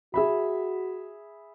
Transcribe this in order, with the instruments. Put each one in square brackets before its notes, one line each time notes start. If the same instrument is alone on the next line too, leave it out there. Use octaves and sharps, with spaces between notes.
[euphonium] F#4 [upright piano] G#4 E5 B5